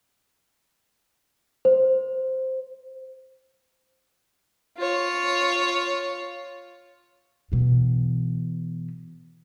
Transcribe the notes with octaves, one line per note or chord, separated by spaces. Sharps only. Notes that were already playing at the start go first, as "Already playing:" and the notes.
C5
F4 C#5
B2 E3